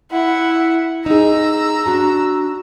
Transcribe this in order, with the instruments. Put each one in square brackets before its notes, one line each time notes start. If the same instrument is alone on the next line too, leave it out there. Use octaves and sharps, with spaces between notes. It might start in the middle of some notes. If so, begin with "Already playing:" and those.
[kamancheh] E4 F#5
[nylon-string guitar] D#4 G#4 [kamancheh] A#5 E6
[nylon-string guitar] D4 F#4 A5